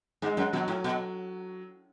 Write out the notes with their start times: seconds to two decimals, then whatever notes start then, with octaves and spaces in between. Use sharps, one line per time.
0.22 G#2 G#3
0.37 F#2
0.53 B2 F#3
0.68 A2
0.84 B2